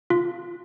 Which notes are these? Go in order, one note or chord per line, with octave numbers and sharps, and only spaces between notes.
F4